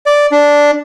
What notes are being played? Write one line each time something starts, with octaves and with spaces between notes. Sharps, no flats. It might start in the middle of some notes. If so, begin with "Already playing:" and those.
D5
D4